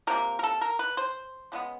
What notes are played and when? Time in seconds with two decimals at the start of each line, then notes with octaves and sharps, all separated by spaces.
0.07 C3 F3 A#3 A#4
0.39 A#4
0.43 A4
0.61 A#4
0.79 B4
0.97 C5
1.52 C#3 E3 G#3 B3